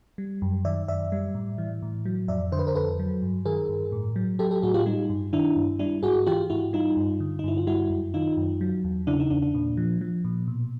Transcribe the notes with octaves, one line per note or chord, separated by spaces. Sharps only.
G3
F#2
D#3 D5 E5
F#2 D5 E5
G3
A2
E3
A2
F#3
F2 D5 E5
D3 C5
B4
A#4 C5
F2 A4 B4
F#3
G2
D#3 G#4 A#4
G2
A2
F#3
F#3 G4 A4
G4 A4
A2 F#4 G#4
F4 G4
G3 D#4
G2
D#3 D4 E4
G2
G3 D4 E4
G#2 F#4 G#4
E3 F4 G4
G#2 E4 F#4
G3 D#4 F4
G2
D3
D#4
G2 E4
F4
G3 E4 F#4
F#2
D#3 D#4 F4
F#2
F#3
E2
C#3 D4 E4
D#4
E2 D4
D4
A#2
F3
F3
A#2
B2